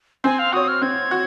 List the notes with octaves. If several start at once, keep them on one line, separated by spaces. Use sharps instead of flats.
C4 G#5
F5
F#4 C#5 D#6
F6
C4 G#6
F#4